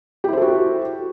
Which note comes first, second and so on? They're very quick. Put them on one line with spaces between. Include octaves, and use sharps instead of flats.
G4 E4 C5 A4 F#4